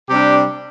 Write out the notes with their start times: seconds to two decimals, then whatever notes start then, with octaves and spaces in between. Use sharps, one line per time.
0.09 C3 G3 D4 G4